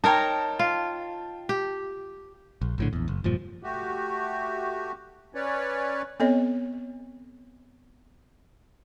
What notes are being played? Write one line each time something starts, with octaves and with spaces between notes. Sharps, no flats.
D#4 A#4 C#5 G5 A5
F4
G4
A#1
A#1 A2 D3
A#1 E2
F#1
E1 G2 A#2 F3
A3 F#4 G4
C#4 B4 C#5 D5
B3 C4 A4 C#5 D#5